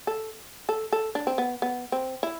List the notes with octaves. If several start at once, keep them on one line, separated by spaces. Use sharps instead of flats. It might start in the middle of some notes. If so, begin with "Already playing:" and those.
A4
A4
A4
D4
C4
B3
B3
C4
E4